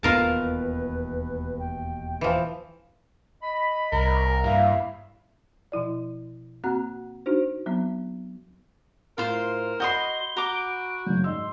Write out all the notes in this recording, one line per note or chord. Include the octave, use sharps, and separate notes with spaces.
E1 D#2 B3 F4 A#4 B4 A5
G5
E3 F3
D#5 B5
C2 A#4
G2 A#3 E4 E5 F5
B2 F3 E4 D5
A#3 C4 F#4 F#5 A#5 F#6
D4 D#4 F#4 C5
F#3 B3 C4
A2 F4 A#4 C5
F#4 D#5 B5 C6 G6 G7
F#4 A#5 D6
D7
F#2 C#3 F#3 G6
G#2 D#5 C6 E6